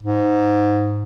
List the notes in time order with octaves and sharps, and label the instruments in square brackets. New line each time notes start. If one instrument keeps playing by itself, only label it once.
[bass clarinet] G#2